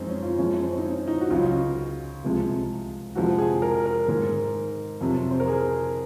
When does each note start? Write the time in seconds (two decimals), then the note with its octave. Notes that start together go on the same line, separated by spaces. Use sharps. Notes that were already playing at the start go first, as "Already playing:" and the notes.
Already playing: F#2 F3 G#3 C4 D#4
0.08 C#4
0.23 F4
0.38 F#2 F3 G#3 C#4
0.61 C4
0.78 D#4
0.84 C#4
1.08 D#4
1.21 F#4
1.30 C#2 C#3 F#3 F4
2.24 C2 C3 F3 G#3
3.15 F2 C3 F3 G#3 F#4
3.38 G#4
3.62 A#4
3.86 A#4
4.08 G#2 D#3 G#3 A#4
5.01 F2 C3 F#3
5.31 C5
5.40 A#4
5.48 G#4